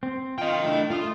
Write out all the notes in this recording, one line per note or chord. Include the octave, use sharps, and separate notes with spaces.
C4
F4 D#5 G5
A3 D4 E4
A3 F4 D#6